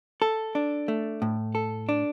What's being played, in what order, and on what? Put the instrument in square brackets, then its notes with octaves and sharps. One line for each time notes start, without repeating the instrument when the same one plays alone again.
[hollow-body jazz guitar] A4
D4
A3
A2
A4
D4